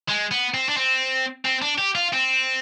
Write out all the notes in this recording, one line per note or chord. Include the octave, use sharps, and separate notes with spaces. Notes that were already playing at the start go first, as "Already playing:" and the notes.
G#3
B3
C4
D4
C4
C4
D4
G4
F4
C4